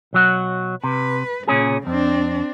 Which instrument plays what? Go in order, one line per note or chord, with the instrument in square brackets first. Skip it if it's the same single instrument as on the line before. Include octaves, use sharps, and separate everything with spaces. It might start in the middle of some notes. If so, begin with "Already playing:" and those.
[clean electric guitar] B1 F#3 F#4
[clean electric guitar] C3 [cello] B4
[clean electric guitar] A#2 C#4 G#4 [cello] C#3
[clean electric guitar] F2 [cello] C4 D4